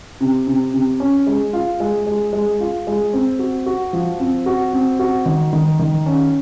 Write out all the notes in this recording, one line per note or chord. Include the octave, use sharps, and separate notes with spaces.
C3
C3
C3
C#4
G#3
F4
G#3
G#3
G#3
F4
G#3
C4
F#4
F#4
F3
C4
F#4
C4
F#4
D#3
D#3
D#3
C#4